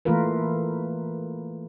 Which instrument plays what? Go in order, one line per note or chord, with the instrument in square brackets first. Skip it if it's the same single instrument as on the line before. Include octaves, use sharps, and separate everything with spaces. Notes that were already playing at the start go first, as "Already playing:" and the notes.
[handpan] E3 A3 A#3 F4 A#4 B4